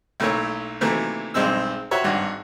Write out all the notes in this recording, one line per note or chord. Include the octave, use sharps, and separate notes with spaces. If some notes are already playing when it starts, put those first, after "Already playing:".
B1 A3 A#3 E4 A#4 C#5
C3 D#3 E3 F#3 A3 A#3
B1 G2 G#3 C4 C5 E6
F#4 G4 C5 C#5 E5
G#1 G2 F#5